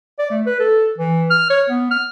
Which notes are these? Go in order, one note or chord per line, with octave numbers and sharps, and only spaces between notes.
D5
A3
B4
A4
E3
F6
C#5
B3
F6